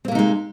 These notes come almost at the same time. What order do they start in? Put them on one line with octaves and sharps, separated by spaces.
C4 A#3 C3 D#4 G#3